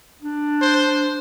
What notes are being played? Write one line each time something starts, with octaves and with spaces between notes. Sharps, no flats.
D4
C5